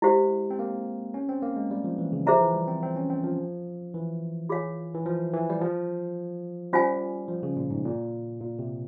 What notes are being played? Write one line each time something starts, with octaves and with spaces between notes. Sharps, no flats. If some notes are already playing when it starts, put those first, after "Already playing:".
G#3 E4 G4 C5 F5
C4
A#3
C#4
C4
A#3
G#3
G3
F3
E3
C#3
F3 G#4 C5 E5 A#5
E3
G3
C4
C4
C#4
C4
F3
E3
F4 G#4 C#5 F5 G#5
E3
F3
E3
G3
F3
G3 C#4 F4 C5 F5 G#5
F3
C#3
A#2
G#2
A#2
A#2
C3